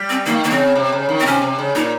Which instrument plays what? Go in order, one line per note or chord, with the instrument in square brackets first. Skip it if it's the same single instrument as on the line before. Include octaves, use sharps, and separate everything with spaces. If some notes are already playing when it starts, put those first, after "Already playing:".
Already playing: [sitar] G3
[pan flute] C4
[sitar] D#3 [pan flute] A#3
[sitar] D#3 [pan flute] A#3
[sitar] C#3 [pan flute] C4
[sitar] C3
C#3
D#3
[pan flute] C4
[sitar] C3 [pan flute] C#4
[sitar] C3
C#3
[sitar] A#2 [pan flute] D#4